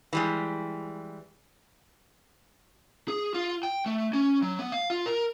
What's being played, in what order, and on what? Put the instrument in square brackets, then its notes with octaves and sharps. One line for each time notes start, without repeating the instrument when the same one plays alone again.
[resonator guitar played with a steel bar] E3 G3 G#3
[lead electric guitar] G#4
F4
G5
A3
C#4
F#3
B3
F5
F4
A#4